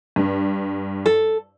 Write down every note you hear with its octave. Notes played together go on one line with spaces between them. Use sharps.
G2
A4